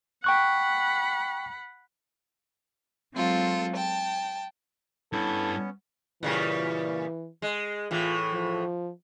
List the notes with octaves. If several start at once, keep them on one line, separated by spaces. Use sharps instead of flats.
F#5 G5 B5 C#6 F#6
F#3 G#3 C4 F4 A4
G5 A5
G2 B3 C#4 E4 A4
A#2 C#3 E3 G3
G#3
A2 E3 F4
F3